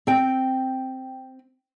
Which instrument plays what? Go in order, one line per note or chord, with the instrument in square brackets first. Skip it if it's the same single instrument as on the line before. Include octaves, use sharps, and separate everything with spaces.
[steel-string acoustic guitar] C4 G5